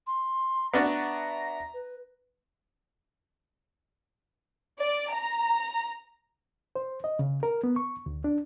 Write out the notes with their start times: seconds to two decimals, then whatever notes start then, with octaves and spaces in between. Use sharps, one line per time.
0.07 C6
0.74 B3 D4 F#4 E5 A#5
1.74 B4
4.80 D5
5.12 A#5
6.76 C5
7.04 D#5
7.19 C#3
7.43 A#4
7.64 B3
7.76 C#6
8.06 D2
8.24 D4